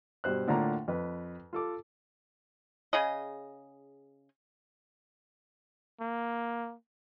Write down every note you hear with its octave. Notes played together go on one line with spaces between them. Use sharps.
G2 B2 C5 F#6
A2 D3 A#3 F4 A#5
F2 B4
F4 A4 D6
C#3 G#4 D#5
A#3